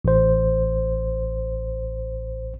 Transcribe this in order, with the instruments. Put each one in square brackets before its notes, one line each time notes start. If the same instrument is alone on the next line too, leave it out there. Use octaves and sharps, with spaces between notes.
[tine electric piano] A1 C5